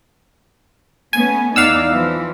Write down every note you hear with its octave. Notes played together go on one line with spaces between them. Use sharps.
A3 B3 C#4 G#5
E2 D#4 D5 F5 F#5 E6
E3 F3